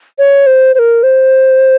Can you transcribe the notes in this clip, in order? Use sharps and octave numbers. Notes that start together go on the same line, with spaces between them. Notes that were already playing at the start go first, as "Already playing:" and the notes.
C#5
C5
C5
A#4
C5